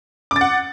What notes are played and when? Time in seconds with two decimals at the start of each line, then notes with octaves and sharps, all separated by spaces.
0.31 D6
0.36 A6
0.41 F#5